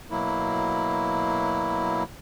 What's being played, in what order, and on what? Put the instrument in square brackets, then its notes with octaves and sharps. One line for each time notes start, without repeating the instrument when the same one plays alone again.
[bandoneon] B2 F#3 A#3 E4